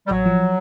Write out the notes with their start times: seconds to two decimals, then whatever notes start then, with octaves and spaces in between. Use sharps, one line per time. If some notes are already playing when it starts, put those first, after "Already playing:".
0.07 G3
0.11 A1 F#3
0.26 F3